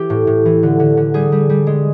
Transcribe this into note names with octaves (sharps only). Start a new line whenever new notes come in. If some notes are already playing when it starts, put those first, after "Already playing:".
Already playing: E3 G4
A2
A2
E3
D3
D3
D3
G3 G#4
G3
G3
G#3